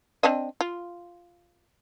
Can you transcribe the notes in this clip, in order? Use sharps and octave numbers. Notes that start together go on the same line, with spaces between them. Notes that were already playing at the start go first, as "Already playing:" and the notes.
C4 D4 D#5
F4